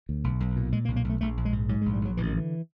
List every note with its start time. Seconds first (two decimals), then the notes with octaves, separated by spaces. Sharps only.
0.09 D2
0.24 B1
0.40 B1
0.56 A#2
0.72 A#2 G#3
0.85 A#3
0.88 B1
0.96 A#3
1.04 B1
1.09 A3
1.21 A#1 A3
1.37 A#1
1.45 G#3
1.53 G#2
1.69 G#2 F#3
1.82 G#3
1.86 A#1
1.94 G3
2.01 A#1 F#3
2.17 A1 E3
2.27 D#3
2.33 D3 E3